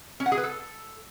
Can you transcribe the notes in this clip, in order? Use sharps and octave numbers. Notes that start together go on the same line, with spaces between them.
C#4
F#5
G#4
B4
A4